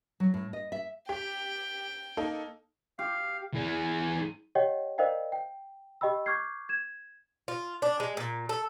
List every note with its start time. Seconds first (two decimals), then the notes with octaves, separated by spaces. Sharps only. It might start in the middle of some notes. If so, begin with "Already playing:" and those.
0.20 F#3
0.34 A2
0.53 D#5
0.72 E5
1.09 G4 G5
2.17 A#3 D#4 A4
2.99 G4 F5
3.55 E3 G#4
4.55 G4 C#5 D#5 F#5 G5
4.98 A#4 C5 D5 D#5 F5 G5
5.32 G5
6.01 G4 D#5 G5 B5 E6
6.26 C#6 D6 F6 G6 G#6 C7
6.69 G#6 E7
7.48 F4
7.82 D4
8.00 G#3
8.17 A#2
8.49 A4